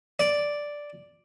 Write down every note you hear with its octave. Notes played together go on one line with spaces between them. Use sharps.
D5